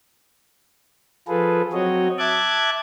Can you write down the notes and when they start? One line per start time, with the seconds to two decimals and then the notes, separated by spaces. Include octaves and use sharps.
1.28 F3 F4 G#4 A4 B4
1.73 F#3 C4 F#4 C#5 D#5
2.19 E5 A5 D6 F#6 G#6